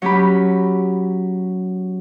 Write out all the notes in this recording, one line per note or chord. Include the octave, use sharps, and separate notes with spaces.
F#3 C#4 G4 B5